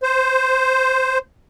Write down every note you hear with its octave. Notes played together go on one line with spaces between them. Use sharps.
C5